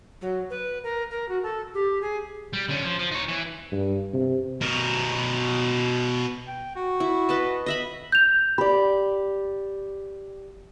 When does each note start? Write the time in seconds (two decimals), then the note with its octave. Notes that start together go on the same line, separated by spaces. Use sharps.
0.21 F#3
0.50 B4
0.83 A#4
1.10 A#4
1.28 F#4
1.42 A4
1.74 G4
2.01 G#4
2.53 G3
2.69 D3 C#4
2.84 F3
2.99 F3
3.11 D#4 C#5
3.28 E3
3.72 G2
4.13 C3
4.61 B2 A#4
6.47 G5
6.76 F#4
7.00 E4
7.29 B4 D#5 A5
7.66 D#5 E5 B5
8.12 G6 F7
8.58 G4 D5 B5